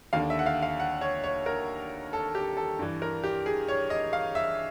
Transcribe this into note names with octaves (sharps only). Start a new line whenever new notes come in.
D#2 D3 F5
E5
F#5
F5
F5
F#5
C#5
C#5
A#4
A4
G4
A4
G2 E3
A#4
G4
G#4
C#5
D#5
F5
E5